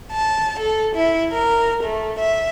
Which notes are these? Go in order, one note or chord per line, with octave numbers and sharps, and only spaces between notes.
A5
A4
E4
A#4
A3
E5